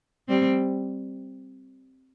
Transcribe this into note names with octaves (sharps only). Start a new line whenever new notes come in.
G3 C4